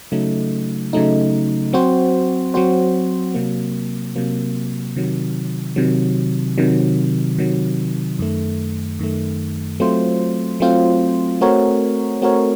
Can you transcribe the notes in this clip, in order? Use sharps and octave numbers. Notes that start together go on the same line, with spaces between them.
C#3 F#3 A3 D#4
C#3 F#3 A3 D#4
F#3 C4 F#4 C5
F#3 C4 F#4 C5
C3 F#3 A#3
C3 F#3 A#3
C3 D#3 F#3
C3 D#3 F#3
C3 D#3 F#3
C3 D#3 F#3
F#2 D#3 A3
F#2 D#3 A3
F#3 A3 C4 F4 C5
F#3 A3 C4 F4 C5
A3 C4 F#4 A#4 C#5
A3 C4 F#4 A#4 C#5